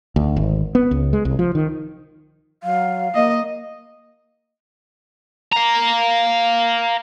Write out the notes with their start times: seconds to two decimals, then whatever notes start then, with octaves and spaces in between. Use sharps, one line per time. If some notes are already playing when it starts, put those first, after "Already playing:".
0.16 D2
0.36 G#1
0.75 B3
0.91 C#2
1.13 G#3
1.25 C2
1.39 F3
1.55 D#3
2.63 F#3 F5
3.15 A#3 D#5
5.52 F5 A#5